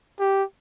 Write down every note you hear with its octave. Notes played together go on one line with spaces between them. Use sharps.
G4